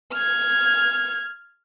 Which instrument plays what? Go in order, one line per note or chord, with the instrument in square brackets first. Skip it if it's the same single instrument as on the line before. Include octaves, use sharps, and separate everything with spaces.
[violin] F6 G#6